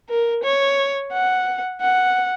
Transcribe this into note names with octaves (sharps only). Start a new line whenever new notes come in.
A#4
C#5
F#5
F#5